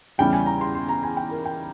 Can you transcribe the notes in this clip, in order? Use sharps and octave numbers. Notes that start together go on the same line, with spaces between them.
E2 C#3 G3 C#4 E4 G5
G#5
A#5
C6
C6
A#5
G#5
G5
A#4
G5